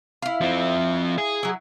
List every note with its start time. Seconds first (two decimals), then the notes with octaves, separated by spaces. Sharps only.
0.22 E4 F5
0.41 F3 C4
1.18 G#4
1.43 F#3 E4